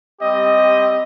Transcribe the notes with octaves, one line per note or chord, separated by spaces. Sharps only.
G3 C4 G4 D#5